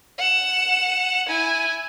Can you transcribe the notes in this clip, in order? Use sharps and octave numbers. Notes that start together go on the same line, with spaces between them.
F#5 E7
E4 G#5